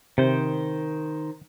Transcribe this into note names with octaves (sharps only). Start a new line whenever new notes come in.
C3 D#3 C5